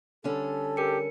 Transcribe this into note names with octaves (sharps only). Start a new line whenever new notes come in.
D3 G3 C#4 A4
G4 A#4 C#7